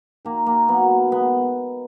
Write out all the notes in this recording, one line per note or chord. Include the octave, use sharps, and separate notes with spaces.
D#3 A#3
D#3 A#3
F#3 B3
A#3
G#3 B3